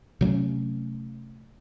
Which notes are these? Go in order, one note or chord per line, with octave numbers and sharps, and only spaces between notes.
C3 F#3 A3 C#4